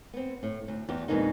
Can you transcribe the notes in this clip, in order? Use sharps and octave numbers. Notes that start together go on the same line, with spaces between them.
B3 C4
A2
D2
E2 F#4 G4
F2 B2 D3 G#3 A#3 D#4